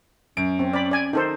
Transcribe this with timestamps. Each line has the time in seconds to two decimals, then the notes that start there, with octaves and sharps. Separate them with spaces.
0.37 F#2 C#4 D7
0.59 C4
0.73 D5 B5
0.91 D5 G#5
1.13 D#3 D#4 A4 C5